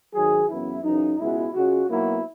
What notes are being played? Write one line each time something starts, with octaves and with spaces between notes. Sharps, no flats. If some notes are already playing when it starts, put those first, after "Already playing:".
G#2 D#3 F#3 G#4
F#2 C#3 E3 B3 E4
F#2 C#3 E3 D#4
C#2 B2 G#3 B3 E4
C#2 C#3 G#3 F#4
B1 B2 F#3 A#3 E4